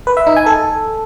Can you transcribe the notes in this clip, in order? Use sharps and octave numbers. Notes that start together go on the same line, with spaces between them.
B4
E5
D#4
G#5
A4